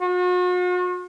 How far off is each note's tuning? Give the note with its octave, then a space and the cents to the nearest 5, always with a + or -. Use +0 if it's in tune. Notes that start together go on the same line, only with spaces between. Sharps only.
F#4 -45